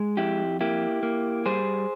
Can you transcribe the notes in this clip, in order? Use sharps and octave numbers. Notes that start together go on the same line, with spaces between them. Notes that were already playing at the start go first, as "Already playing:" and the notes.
Already playing: G#3
F2 E4 G4
A#3 E4 G4
A#3
G3 G#4 C5